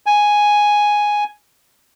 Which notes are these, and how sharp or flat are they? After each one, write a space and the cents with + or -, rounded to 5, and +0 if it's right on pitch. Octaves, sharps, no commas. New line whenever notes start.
G#5 +0